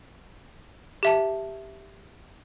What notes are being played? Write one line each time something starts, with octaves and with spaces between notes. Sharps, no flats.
G4 E5 A5